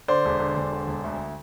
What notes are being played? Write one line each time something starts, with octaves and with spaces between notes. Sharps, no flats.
D3 C5 D5
E1
D3
E1
D3
E1
D2